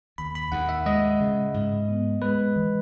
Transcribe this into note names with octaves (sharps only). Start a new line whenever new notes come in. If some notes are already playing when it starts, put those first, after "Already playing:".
D#2 B5
B5
D#2 F#5
E5
G#3 D#5
C#3
G#2
B3
G#3 B4
E3